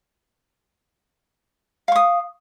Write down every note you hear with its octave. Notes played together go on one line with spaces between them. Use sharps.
F5 C#6 D#6